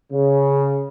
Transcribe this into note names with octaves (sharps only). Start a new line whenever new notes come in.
C#3